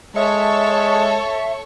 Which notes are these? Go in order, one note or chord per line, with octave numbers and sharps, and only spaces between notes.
G#3 A4 C#5 E5 A5 C#6